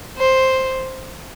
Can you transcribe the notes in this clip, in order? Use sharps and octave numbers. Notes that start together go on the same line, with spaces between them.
C5